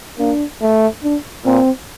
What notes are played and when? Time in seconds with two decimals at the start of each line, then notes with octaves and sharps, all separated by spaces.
0.18 A#3 D4
0.62 A3
1.03 D4
1.45 A#2 C4